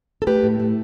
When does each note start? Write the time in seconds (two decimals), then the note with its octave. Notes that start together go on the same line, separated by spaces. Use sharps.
0.22 A4
0.27 A3 G4 B4
0.43 A2
0.60 A3